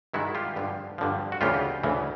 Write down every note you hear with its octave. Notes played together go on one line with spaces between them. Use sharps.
G2 D#3 G#3 E4 F#4
F4 G4
G2 D3 F3
G2 D3 F3
F#4
D2 C#3 E3 F4 G4
D2 C#3 E3